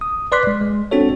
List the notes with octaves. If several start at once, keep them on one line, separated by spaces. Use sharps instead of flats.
D#6
B4 D5 C6 D6 F#6 B6
G#3
G#3
C4 D4 F#4 A4 C#5